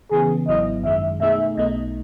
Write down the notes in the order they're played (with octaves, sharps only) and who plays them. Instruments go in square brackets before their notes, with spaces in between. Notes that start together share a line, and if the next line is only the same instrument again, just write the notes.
[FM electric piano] C#3 E3 B3 [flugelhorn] G#4
[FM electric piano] G#1 G#2 F#3 B3 E4 [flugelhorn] D#5
[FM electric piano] F#2 D#3 G#3 [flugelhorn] E5
[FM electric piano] B2 A3 D#4 G#4 [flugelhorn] E5
[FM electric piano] B1 B2 A3 D#4 [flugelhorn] D#5